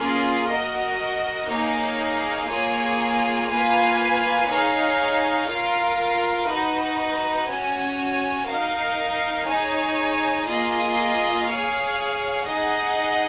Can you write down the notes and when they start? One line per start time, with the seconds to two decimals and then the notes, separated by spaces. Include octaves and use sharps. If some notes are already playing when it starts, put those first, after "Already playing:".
Already playing: A#3 C#4 F4 G#4
0.49 F#4 A#4 D#5
1.48 A#3 D#4 G#4 C#5 F5
2.47 A#3 F4 G#4 C#5 G#5
3.47 A#3 F4 B4 F5 G#5
4.47 D#4 G#4 C#5 F5
5.47 F4 A#4 F5
6.47 D#4 F#4 B4
7.47 C#4 F#4 C#5 G#5
8.47 D#4 A#4 F5
9.46 D#4 G#4 C#5 G#5
10.46 A#3 F4 G#4 D#5
11.46 G#4 C#5 F5
12.46 D#4 G#4 D#5 F#5